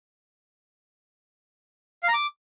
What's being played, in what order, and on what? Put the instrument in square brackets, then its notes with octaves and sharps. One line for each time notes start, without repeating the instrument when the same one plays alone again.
[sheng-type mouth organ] F5
A#5
D6